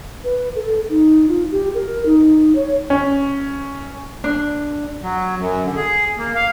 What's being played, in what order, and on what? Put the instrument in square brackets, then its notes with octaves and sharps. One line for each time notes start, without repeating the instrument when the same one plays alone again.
[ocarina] B4
A4
D#4
F4
G4
A#4
D#4
C#5
[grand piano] C#4
[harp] D4
[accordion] F#3
F#2
D3
G#4
A#3
F5